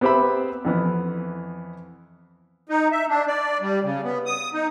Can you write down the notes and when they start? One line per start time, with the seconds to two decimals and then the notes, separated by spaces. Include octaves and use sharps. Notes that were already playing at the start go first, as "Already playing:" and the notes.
0.01 B3 C4 G4 B4 E5 B5
0.65 F2 E3 B3
2.69 D#4
2.92 E5
3.08 D4
3.27 D5
3.61 G3
3.83 C#3
4.03 B3
4.26 D#6
4.54 D#4